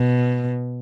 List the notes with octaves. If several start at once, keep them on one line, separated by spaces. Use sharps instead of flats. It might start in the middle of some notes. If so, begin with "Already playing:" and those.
Already playing: B2